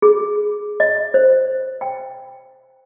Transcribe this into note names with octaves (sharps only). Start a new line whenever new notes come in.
G#4
D#5
C5
G5